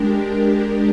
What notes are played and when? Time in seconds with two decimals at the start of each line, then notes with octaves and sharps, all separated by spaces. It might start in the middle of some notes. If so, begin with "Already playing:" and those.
Already playing: G#3 D4 G4 A#4